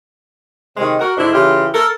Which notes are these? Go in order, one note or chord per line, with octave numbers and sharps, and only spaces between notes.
C3 D#3 G#3
F#4 A#4
G#2 D3 A3 D4 E4
C#3 E3 F4 G4
A4 A#4